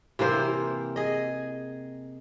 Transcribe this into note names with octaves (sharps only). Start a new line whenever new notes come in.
C3 E3 A#3 C5
G#4 D#5